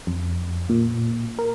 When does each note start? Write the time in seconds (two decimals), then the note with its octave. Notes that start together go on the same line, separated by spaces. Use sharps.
0.07 F2
0.69 A#2
1.39 A#4